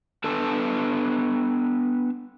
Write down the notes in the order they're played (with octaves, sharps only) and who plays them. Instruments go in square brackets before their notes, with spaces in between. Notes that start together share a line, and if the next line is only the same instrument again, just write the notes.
[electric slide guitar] B3 D4 A4 B4 A5